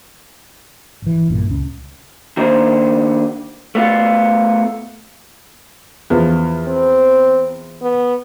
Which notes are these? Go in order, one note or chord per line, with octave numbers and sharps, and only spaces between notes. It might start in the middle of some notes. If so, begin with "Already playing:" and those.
G#1 E3
A#1 G2 A#2
C#2 C#4
D#3 A#3 D4 D#4 C5
A3 B3 F4
E2 F3
C4
B3